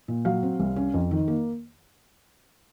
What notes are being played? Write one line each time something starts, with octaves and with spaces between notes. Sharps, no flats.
A#2
F#3 F5
C4
C2
C#4
F2
D#3
A#3